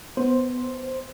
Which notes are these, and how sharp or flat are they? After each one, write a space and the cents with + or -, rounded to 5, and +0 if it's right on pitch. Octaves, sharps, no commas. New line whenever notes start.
B3 +15 C5 +0